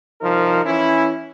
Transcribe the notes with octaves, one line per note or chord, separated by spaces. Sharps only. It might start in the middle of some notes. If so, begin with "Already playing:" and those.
C2 F3 D#4 A#4
E3 C#4 E4